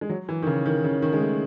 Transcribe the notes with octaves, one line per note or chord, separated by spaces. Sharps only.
G#3
F#3
E3
D#3
C#3
D#3
C#3
D#3
G#3
A3